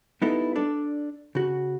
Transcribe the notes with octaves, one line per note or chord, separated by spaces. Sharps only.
G3 B3 D#4 E4 A4
D4 A4 D5
C#3 F#4